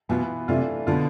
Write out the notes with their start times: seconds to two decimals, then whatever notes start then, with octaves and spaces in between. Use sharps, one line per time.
0.09 B2 E3 B3 F4
0.48 C3 E3 A3 D4 F4
0.87 B2 D3 B3 F4